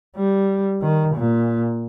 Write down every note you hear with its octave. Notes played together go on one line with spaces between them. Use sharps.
G3
D#3
A#2